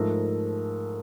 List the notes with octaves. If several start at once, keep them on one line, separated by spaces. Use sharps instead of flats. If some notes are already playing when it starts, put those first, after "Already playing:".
Already playing: G#2 F3 A3 A#4